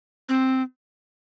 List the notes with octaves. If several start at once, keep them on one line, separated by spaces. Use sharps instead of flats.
C4